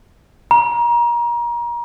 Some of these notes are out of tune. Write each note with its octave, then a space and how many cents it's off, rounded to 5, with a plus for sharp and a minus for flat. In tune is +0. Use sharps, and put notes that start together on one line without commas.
A#5 +30